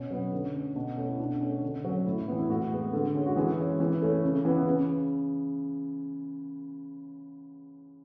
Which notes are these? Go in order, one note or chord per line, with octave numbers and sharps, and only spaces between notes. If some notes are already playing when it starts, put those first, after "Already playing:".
Already playing: B2 C#4
F#3 B3
D3
A3 C#4
B2
A3 C#4
E4
B2 D4
A3 C#4
D3
F#3 C#4
A2 E4
E3 B3
E4
A2 F#4
G#3 B3
D3
G#3 C#4
F#4
E3 G#4
G#3 C#4
E3
A3 C#4
C#3
E3 B3
C#3